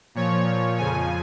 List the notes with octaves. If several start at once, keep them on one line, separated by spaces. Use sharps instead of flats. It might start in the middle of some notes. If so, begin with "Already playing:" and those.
A#2 F3 C#5
F2 C#3 F3 G#5